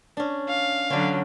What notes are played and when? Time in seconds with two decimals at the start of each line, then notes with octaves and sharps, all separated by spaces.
0.17 C#4 D4
0.49 F5
0.90 D3 F#3 C#4 D4